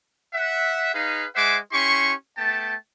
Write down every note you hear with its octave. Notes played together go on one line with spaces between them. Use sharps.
E5 F#5
D#4 G#4 B4 F5
G#3 C5 E5 F#5 G#5 D6
C#4 E4 G4 C6 C#6
A3 B3 G5 A5